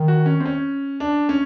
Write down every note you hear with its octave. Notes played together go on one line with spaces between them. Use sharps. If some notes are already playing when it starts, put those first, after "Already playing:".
Already playing: D#3
F#4
C#4
C4
C#4
D4
C#4